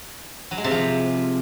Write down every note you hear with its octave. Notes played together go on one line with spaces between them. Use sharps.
F#3
G#3
C3
F3